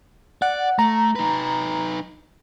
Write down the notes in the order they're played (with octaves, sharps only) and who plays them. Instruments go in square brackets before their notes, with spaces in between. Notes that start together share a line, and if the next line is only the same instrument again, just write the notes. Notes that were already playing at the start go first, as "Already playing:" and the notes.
[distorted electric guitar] D5 [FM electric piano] F#5
[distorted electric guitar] A3 [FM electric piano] A#5
[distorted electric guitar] D#4 B4